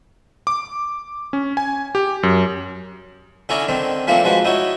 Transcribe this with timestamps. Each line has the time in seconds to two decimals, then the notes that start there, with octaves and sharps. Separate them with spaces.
0.47 D6
1.33 C#4
1.57 G#5
1.95 G4
2.23 F#2
3.49 D3 C#4 E4 C#5 D5 A#5
3.69 D3 D#3 C4
4.07 E3 F3 A3 A#3 C4 D4
4.24 F3 G#3 F#4 B4
4.44 D#4 E4 F#4 C#5